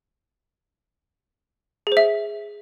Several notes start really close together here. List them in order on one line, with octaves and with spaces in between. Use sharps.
G#4 C5 E5